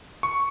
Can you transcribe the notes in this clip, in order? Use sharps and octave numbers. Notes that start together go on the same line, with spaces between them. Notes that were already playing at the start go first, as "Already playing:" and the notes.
C#6